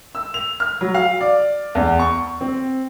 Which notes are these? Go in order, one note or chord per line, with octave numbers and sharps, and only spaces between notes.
E6
F7
F6
F#3
F5
D5
E2
C#6
C4